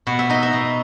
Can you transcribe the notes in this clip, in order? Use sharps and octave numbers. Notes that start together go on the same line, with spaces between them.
B2 F#5
E5
D#4 D#5
E5
B2